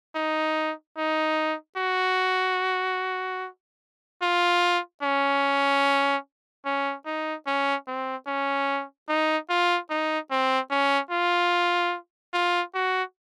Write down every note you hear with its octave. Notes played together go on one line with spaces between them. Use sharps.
D#4
D#4
F#4
F4
C#4
C#4
D#4
C#4
C4
C#4
D#4
F4
D#4
C4
C#4
F4
F4
F#4